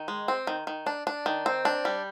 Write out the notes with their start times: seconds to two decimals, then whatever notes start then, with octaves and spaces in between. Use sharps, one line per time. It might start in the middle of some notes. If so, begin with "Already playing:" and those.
Already playing: D#3
0.08 G#3
0.28 C4
0.47 D#3
0.67 D#3
0.86 D4
1.07 D4
1.26 D#3
1.46 C4
1.65 D4
1.85 G3